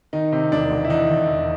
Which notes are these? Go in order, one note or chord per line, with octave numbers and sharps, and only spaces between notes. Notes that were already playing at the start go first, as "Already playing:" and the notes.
D#3 D#4
C3
E1 D4
E1
E4
E2 D#4
E2
E2